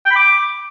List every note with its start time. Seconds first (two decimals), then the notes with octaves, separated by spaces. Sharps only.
0.05 G5
0.10 B5
0.16 D6